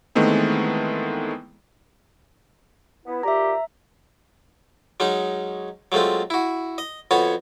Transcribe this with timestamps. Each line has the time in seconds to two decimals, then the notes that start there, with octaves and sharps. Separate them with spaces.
0.15 D#3 E3 G#3 A3 B3 C4
3.06 B3 E4
3.23 A#2 G4 E5 A#5
5.00 F#3 G#3 C#4 D#4
5.92 F#3 G#3 A3 C4 F4
6.30 E4 F#4
6.78 D#5
7.11 F2 B3 F#4 C#5 G#5